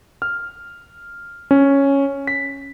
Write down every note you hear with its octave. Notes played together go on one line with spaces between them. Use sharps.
F6
C#4
B6